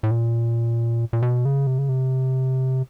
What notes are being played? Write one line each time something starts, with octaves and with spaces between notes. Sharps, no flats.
A2
A#2
A#2
B2
C#3
C3
C#3
C3